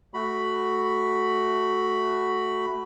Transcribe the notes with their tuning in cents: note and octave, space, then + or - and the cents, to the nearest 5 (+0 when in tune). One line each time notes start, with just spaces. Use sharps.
A3 +0 F#4 +10 B5 +0